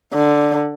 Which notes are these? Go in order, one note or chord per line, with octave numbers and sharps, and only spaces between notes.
D3